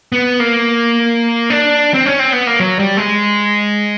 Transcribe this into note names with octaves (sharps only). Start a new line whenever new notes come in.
B3
A#3
D4
C4
C#4
C4
B3
A#3
F#3
G3
G#3